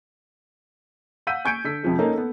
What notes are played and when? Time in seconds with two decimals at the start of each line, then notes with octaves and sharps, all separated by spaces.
1.27 F5 F#5 E6 G6 B6 D#7
1.45 G#5 C#6 G6 G#6 C#7 D7
1.64 D3 A4 E6 B6
1.83 F2 C3 F3 G#3
1.99 A#3 C#4 D#4 A4 A#4
2.14 B3 A4